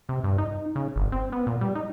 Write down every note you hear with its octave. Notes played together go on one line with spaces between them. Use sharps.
C3
G2
D#4
C#3
G1
C4
B3
A#2
G3
D#4